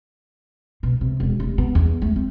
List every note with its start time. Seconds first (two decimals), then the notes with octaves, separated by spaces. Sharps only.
0.83 B2
1.01 C3
1.20 E1
1.40 F1
1.58 B3
1.75 E2
2.02 A3
2.16 C4